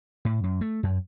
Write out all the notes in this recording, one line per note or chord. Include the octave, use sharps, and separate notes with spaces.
A2
F#2
A3
F#2